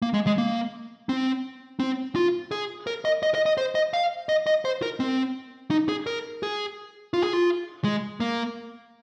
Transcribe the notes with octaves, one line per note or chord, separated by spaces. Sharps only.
A#3
G#3
G#3
A#3
C4
C4
F4
G#4
A#4
D#5
D#5
D#5
D#5
C5
D#5
F5
D#5
D#5
C5
A#4
C4
D#4
G#4
A#4
G#4
F4
G#4
F4
G#3
A#3